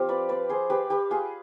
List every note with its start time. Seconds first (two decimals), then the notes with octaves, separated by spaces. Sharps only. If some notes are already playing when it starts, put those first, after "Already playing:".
Already playing: F3 C4 F4 G4
0.09 B4 D5
0.29 B4 D5
0.49 G#4 C5
0.70 G4 B4
0.90 G4 B4
1.11 F4 G#4